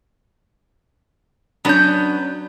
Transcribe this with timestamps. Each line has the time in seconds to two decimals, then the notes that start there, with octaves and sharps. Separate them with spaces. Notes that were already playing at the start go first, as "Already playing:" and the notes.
1.65 F#3 B3 C#4 D4 G6